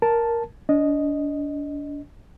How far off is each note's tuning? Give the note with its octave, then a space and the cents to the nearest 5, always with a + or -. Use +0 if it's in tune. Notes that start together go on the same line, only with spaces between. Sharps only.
A#4 +0 A5 +0
D4 -30 D#5 +0